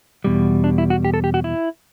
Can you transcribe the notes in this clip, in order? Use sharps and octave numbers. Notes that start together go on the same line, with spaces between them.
E2 B2 G3
D4
E4
F#4
G4
A4
G4
F#4
E4